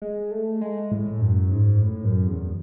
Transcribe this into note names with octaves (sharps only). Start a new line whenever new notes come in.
G#3
A3
G#3
A2
F#2
G#2
A2
F#2
E2